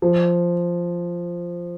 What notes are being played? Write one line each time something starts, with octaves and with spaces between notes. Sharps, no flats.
F3